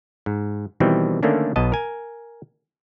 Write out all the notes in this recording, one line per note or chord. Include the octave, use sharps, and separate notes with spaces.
G#2
B2 D#3 E3 G3 C4
D3 D#3 A3 A#3 C#4 D4
B1 B2 B3 D#5 A5
A#4 G#5